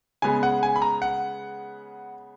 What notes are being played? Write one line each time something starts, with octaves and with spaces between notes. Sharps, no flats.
C#3 G#3 B3 G#5
F#5
G#5
B5
A#5
F#5